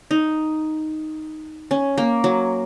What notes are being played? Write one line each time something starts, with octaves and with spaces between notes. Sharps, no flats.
D#4
C#4
A#3
F#3